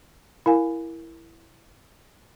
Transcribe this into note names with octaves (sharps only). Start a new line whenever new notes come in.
E4 A#4 F5 G#5